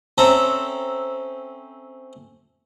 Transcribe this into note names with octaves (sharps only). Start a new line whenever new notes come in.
C4 C#4 A4 E5 A#5